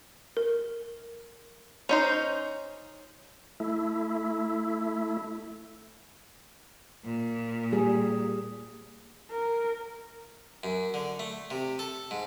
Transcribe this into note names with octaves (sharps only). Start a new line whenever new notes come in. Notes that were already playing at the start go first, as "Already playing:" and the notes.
A#4
C#4 D#4 C5
A3 E4
A#2
G3 G#4
A#4
F#2
D3
A3
C3
A4
G#2